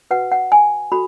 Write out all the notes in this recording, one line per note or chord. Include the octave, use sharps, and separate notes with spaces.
F#4 B4 F#5
F#5
G#5
F#4 A4 B5